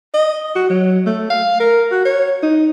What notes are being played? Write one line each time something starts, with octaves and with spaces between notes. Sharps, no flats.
D#5
F#4
F#3
A3
F5
A#4
F#4
C#5
D#4